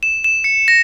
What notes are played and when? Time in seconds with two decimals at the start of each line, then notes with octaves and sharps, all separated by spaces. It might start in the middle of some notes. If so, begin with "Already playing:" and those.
0.03 E7
0.24 E7
0.44 C#7
0.68 A#6